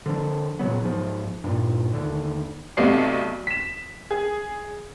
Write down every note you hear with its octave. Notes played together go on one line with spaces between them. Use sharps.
D3 F3 D4
A#2 C#3 F#3 B3
G#2 F3
G2 A#2
D#2 D3
B1 C3 A3 B3 D5 C7
B6 E7
G#4